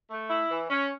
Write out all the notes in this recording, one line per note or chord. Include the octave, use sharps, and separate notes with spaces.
A3
E4
E3
C#4